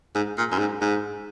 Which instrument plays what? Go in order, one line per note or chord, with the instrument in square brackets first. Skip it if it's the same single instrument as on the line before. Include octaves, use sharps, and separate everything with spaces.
[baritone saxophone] G#2
A#2
F#2
G#2
G#2